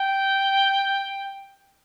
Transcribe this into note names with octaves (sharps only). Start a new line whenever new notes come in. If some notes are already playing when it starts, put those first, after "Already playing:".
Already playing: G5